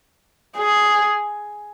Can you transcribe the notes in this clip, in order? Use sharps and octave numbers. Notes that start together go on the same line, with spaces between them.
G#4